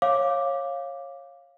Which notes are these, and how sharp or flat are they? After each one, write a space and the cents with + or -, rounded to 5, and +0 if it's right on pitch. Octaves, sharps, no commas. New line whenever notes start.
C#5 -20 F5 +0 D6 +0